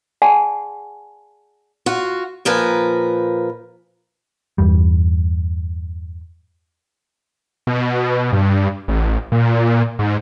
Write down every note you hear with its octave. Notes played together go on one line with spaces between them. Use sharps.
G#4 D5 F#5 G#5 A5 C6
F4 F#4
A#2 F3 A#4 B4 G#5
E2 G2 G3
B2
G2
A1
A#2
G#2